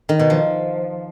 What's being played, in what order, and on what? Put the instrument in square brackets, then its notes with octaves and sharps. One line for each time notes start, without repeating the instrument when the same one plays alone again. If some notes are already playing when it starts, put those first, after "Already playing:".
[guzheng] D#3
B2
F3